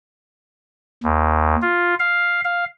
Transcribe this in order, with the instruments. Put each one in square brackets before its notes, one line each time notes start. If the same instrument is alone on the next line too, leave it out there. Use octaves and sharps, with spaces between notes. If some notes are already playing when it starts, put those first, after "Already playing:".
[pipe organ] D#2
F4
F5
F5